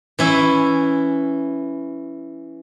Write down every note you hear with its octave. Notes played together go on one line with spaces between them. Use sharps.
E3 C#4 E4